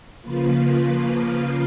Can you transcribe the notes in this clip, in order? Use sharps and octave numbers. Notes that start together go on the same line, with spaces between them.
C#3 F3 A#3 F4 B4